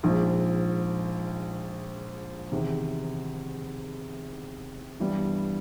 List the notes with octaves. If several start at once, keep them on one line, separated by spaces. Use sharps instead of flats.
A#1 G#2 F3
E2 C3 D#3
G2 E3 G3 B3